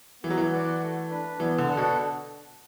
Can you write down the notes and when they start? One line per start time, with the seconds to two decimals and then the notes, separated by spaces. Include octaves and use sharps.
0.23 E3 B3
0.31 F#3
0.38 E3
0.52 F#4 D5 F#5
0.82 A3
1.10 D4 B4
1.40 E3 B3
1.58 D3
1.68 D4 A4 F#5
1.77 B2